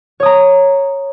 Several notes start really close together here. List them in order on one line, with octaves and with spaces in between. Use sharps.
C#5 D#6 A#5